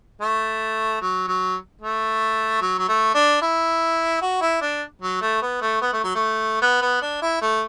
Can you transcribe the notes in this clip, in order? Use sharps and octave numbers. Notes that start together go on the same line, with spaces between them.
A3
F#3
F#3
A3
F#3
F#3
A3
D4
E4
F#4
E4
D4
F#3
A3
B3
A3
B3
A3
F#3
A3
B3
B3
D4
E4
A3